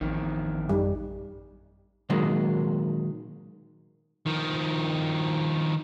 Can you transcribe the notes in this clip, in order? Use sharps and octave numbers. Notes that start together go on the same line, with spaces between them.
A1 F2 D#3
F#2 G3 D#4
A#2 D#3 F#3 G#3 A#3
D#3 F3